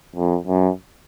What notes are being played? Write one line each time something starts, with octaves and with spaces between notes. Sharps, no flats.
F2
F#2